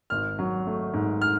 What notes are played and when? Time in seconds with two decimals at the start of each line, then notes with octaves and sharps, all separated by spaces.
0.10 G#1 F6
0.39 F#3
0.67 A3
0.94 G#2
1.21 F6